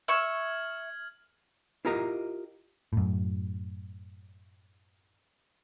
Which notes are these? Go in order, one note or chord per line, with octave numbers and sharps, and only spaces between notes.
E5 C#6 F6 G#6 F#7
E4 F4 G4 A#4 D#5 A#5
F#2 A2